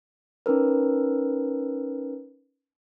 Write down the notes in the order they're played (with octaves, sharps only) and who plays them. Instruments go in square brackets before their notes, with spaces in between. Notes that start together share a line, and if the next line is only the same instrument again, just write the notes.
[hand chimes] C#4 D#4 A#4 B4